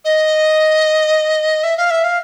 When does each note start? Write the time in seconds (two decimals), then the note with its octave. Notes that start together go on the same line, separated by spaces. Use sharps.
0.04 D#5
1.63 E5
1.77 F5
1.90 E5
2.04 F5